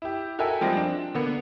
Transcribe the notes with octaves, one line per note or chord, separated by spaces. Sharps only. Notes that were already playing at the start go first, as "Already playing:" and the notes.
E4 G4
F#4 A4 A#4 E5 G5 G#5
F3 G3 G#3 C4 G4
D4
D3 A#3 B3